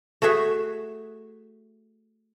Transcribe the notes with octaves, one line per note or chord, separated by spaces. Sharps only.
A3 F#4 G#4 E5